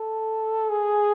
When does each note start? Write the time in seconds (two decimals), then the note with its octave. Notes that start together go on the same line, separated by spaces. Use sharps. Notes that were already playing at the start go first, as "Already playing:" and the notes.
Already playing: A4
0.69 G#4